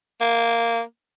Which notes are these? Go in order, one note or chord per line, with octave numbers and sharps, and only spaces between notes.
A#3